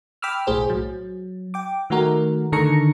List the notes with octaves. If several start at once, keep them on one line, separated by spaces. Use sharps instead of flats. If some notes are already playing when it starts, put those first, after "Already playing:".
G5 B5 D6 E6 F6
B1 A2 G#4 C5
F#3
G5 D6
D#3 A3 F#4 A#4
D3 D#3 A4 A#5 C#6 C#7